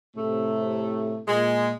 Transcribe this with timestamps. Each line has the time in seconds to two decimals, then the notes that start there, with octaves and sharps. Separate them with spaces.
0.16 A2 C3 A3
1.28 A#2 G#3